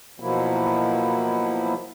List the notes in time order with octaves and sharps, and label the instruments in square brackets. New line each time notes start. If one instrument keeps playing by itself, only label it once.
[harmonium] B2 F3 F#3 A#3 E4